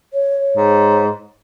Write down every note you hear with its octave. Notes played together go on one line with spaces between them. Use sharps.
C#5
G#2